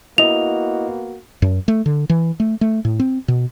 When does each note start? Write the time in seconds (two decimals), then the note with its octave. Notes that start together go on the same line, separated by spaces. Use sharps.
0.18 A#3 B3 E4 F#4 D#5 F7
1.42 F#2
1.68 A3
1.86 D3
2.10 E3
2.40 A3
2.61 A3
2.85 A2
3.00 C4
3.28 B2